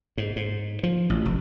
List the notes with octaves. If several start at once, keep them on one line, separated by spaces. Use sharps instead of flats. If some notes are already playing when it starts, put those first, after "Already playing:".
G#2
G#2
F3
A1
F1